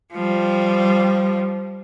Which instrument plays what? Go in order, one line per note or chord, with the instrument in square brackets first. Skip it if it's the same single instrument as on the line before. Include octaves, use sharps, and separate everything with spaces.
[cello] F3 G3